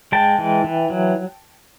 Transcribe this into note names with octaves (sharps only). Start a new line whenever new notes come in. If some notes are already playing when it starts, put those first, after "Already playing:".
G#3 G5 A5
E3
E3
F#3